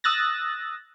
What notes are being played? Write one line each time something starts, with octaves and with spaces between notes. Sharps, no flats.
D#6 E6 F#6 A6 A#6